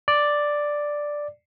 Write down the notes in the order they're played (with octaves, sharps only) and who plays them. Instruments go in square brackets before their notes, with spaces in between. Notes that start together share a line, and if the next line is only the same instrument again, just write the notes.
[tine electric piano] D5